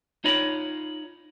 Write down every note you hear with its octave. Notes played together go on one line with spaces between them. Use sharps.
D#4 F4 C#5 D#5 B5